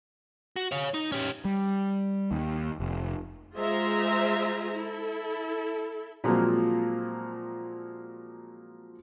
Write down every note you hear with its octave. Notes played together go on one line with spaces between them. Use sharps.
F#4
C#5 F5
D#4
C#4 G4
G3
D#2
F1
G#3 F4 G#4 C5 E5 A#5
E4 A4
A#2 F3 F#3 G#3 A#3 C4